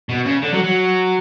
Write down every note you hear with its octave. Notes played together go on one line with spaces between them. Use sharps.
B2
C#3
D3
F#3
F#3